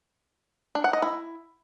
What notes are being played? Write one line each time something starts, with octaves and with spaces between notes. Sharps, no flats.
D4
F#5
D#5
E4